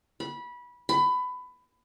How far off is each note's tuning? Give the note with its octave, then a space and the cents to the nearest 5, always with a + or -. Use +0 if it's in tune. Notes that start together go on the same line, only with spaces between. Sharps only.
B5 -20
B5 +20